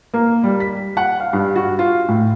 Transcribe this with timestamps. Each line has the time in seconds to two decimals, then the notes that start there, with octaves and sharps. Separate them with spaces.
0.14 A#3
0.44 G3
0.60 B6
0.97 F#5
1.20 F5
1.33 G2
1.56 F#4
1.79 F4
2.08 A2